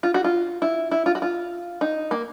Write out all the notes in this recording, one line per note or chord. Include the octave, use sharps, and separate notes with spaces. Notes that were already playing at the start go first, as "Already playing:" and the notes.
F4
F#4
F4
E4
E4
F4
F#4
F4
D#4
A#3